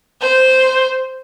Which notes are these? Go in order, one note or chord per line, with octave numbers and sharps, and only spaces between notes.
C5